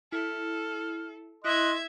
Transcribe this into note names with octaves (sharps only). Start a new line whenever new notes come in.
E4 A4 F6
E4 D#5 E5 C6 F#6 G#6